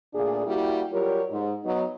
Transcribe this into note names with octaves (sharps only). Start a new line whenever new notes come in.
D2 A#2 D4 G#4
G3 A#3 E4 F#4 G4
F#3 G3 F4 G4 A#4 C#5
G#2
F#3 B3 D#4